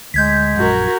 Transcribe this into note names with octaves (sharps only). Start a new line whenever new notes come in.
D2 G#3 G6 G#6 B6
A#1 F#2 F#4 A#4